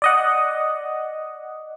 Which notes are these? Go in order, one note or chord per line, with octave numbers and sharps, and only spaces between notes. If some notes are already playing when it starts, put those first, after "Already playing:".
D5 D#5 F#5